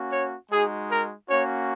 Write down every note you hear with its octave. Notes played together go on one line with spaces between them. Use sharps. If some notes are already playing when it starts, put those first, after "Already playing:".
Already playing: A#3 C#4 F#4
C#5
G#3 D#4 F#4 G#4
A#4
A#3 C#4 F#4 C#5